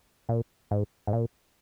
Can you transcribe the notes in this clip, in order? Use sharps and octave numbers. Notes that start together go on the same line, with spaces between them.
A#2
G#2
G#2
A#2